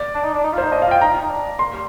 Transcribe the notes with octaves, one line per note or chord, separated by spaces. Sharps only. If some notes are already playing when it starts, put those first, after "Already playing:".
Already playing: D5
D4
D#4
D4
D#4
F4
C5
D#4
D4 D#5
F5
F4 G5
D#4 A#5
F4
D#4
D4
A#3 C6
G3